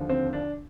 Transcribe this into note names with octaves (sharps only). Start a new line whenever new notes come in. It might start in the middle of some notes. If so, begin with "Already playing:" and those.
Already playing: D#2 D3 F3
C4
D4